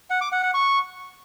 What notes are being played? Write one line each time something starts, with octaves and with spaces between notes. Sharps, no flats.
F#5
D6
F#5
F#5
C#6